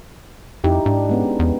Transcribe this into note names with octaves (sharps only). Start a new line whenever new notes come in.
F2 D#4 E4 G4
G#2 D4
G#3 B3 C#4
E2 B3